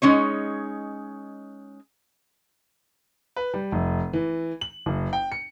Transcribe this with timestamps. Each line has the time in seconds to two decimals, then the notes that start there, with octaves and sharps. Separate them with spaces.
0.02 G#3 C#4 D#4 C#5
3.36 B4
3.54 G3
3.72 F1
4.13 E3
4.61 F#7
4.86 F#1
5.13 G5
5.32 C#7